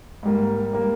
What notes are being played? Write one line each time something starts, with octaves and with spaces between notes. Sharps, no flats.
G#2 G3 A#3
G3 A#3